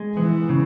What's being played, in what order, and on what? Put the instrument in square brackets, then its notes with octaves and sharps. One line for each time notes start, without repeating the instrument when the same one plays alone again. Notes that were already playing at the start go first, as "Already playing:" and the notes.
Already playing: [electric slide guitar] G#3
[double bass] E3 [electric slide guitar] B3
[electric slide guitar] C#3